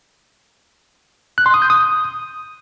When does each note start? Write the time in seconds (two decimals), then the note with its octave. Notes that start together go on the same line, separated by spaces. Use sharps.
1.38 F#6
1.46 C6
1.54 D#6
1.62 G6
1.70 D#6